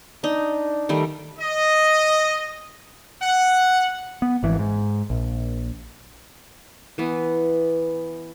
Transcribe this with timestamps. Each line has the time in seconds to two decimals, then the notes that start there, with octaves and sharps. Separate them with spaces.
0.24 D4 D#4
0.89 D#3 G3 A3
1.40 D#5
3.21 F#5
4.22 B3
4.43 G#1 E3
4.59 G#2
5.10 A#1
6.98 E3 B3